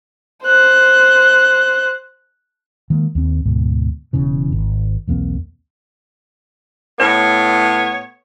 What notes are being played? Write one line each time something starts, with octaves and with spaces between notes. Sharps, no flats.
C5 F#6
D#3 G#3 A#3
D#2 C4
D2 G#2 B2
E1 E2 C#3 E3
G#1
B1 E2 A#3 C4
A2 B3 C#5